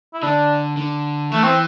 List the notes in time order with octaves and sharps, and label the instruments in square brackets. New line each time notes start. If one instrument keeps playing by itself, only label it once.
[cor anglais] E4
[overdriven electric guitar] D3 [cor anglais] D4
[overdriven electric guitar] D3
[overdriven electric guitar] E3 [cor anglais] A3
[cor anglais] C4